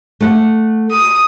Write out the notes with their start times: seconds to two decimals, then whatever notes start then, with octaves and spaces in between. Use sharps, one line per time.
0.20 A3 F#5
0.91 D#6